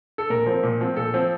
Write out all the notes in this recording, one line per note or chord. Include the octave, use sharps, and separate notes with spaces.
A4
A#2 A#4
F3 C4
A#2
F3 C4
A#2 A4
F3 C4